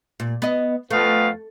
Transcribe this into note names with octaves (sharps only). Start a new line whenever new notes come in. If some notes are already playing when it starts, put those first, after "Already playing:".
A#2
B3 D#5
F2 A3 B3 F5